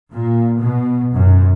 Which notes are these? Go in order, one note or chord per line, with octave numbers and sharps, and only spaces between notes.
A#2
B2
F#2